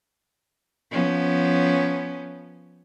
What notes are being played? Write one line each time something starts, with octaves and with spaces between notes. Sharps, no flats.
F3 B3 C#4